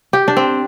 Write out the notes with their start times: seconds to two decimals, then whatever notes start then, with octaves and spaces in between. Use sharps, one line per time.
0.13 G4
0.28 D4
0.37 C4